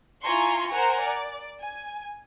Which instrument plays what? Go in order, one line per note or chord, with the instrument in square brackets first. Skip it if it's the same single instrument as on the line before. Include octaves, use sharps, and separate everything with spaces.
[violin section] E4 F4 G#5 A#5 C6 C#6
A#4 C5 F#5 G#5 A#5
D5
G#5